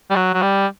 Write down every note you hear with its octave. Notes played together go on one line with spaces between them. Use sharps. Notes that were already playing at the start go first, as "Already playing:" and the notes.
G3
F#3
F#3
G3